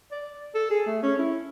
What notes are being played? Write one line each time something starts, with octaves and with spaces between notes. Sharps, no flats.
D5
A4
G#4
A3
C#4
E4